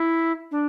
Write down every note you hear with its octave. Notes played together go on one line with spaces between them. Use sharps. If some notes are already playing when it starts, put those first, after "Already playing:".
Already playing: E4
D4